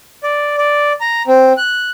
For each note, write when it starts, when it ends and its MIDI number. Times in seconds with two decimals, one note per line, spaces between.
0.23 0.56 74
0.58 0.93 74
1.01 1.22 82
1.27 1.53 60
1.57 1.91 90